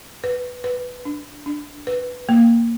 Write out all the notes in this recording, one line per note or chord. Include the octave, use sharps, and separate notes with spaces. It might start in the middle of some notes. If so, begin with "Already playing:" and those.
B4
B4
D4
D4
B4
A#3